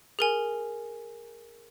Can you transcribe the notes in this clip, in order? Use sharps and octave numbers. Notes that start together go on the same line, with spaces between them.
G#4 A#4 G#5